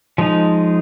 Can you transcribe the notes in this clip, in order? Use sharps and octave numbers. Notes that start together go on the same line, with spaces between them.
F3 G#3 D#4